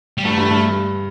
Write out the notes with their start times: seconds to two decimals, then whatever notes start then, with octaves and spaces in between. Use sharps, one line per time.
0.18 G3
0.25 G2 A3
0.37 G2
0.51 G2